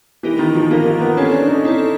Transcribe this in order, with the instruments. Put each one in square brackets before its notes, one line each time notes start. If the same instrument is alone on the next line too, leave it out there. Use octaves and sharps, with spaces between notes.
[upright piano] E3 [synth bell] B3 D#4 G4 A#4
[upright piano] D#3
F3
[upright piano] A#3 [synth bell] B3 D#4 G4 A#4
[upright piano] A#3
B3
[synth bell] C4 E4 A4 C#5 [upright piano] C#4
[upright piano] D4
D#4
[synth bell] C4 E4 A4 C#5